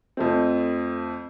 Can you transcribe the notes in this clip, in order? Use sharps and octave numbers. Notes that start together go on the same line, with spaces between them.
F2 A3 C4